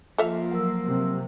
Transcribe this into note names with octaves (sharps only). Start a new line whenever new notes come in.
F3 A#3 F4 A4 E5 F5
F#3 A#4 E6
C3